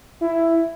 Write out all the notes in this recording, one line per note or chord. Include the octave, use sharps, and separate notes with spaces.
E4